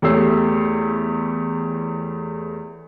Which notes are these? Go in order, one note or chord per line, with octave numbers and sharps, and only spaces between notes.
E2 A3 G4 C#5 E6 C7